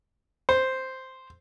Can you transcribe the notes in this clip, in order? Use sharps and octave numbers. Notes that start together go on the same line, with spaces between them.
C5